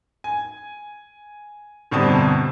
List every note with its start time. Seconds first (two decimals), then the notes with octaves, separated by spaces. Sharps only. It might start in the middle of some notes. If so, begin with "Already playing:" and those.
0.24 G#5
1.91 G1 B2 G3 C4 A5 D#6